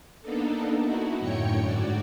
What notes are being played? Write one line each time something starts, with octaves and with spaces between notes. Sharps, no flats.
A#3 B3 D4 D#4 A4
D#4 E4 F#4
F#2 A2 D3 C#5 G5 C#7
G#2 F#4 D5